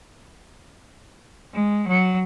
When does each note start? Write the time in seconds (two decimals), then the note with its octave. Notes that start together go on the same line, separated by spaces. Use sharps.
1.54 G#3
1.88 F#3